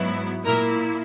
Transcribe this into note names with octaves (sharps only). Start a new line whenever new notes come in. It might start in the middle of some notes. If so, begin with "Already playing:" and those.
Already playing: G#2 F#3 B3 E4
A#2 A#3 E4 A#4